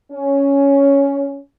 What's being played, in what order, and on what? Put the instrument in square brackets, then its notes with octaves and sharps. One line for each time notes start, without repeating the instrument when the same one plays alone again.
[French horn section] C#4